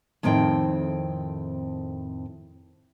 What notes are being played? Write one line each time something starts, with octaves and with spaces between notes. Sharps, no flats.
F2 A2 D#3 C4 G5